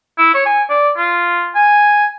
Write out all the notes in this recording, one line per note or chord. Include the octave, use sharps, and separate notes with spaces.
E4
C#5
G#5
D5
F4
G#5